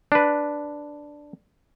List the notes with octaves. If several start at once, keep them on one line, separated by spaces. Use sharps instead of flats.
D4 B4